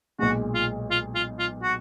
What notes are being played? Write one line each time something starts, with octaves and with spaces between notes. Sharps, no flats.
B1 A#2 G#3 F#4
F4
F4
F4
F4
F#4